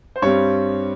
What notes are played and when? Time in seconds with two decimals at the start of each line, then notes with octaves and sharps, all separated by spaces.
0.16 C5
0.22 G2 G3 C4 C#5